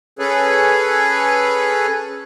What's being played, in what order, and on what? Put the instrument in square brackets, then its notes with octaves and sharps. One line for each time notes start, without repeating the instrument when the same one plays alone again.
[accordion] C#4 G#4 A4 B4 C#5